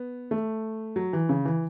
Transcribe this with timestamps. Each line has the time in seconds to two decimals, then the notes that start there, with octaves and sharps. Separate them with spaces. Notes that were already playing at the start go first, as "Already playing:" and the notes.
Already playing: B3
0.31 A3
0.96 F#3
1.13 E3
1.29 C#3
1.45 E3